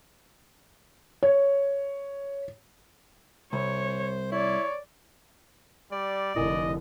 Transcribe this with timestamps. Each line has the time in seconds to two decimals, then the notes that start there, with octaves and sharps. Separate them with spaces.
1.23 C#5
3.53 C2 C5 C#5
4.32 E4 C#5 D5
5.92 G3 D5
6.36 F1 D3 E4 A#4 D#5 G#5